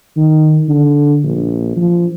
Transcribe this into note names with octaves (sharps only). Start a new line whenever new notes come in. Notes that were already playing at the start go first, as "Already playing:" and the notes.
D#3
D3
A#1
F3